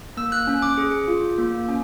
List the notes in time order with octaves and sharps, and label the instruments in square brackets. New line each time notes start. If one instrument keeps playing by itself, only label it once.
[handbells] A#3 E6
F#6
C#4 F#6
D6
G#4
F4
A#3
C#4